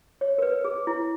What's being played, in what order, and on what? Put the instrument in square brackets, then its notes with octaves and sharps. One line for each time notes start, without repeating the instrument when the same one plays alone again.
[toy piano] C#5
A#4
B4
G#4
E4